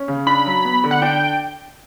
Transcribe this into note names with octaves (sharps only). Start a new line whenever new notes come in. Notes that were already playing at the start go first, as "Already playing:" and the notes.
Already playing: C#4
C#3
D4 B5
F#3
B3
D3
F#5
D4 G5